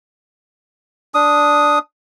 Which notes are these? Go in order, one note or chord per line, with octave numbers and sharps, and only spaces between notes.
D4 D#6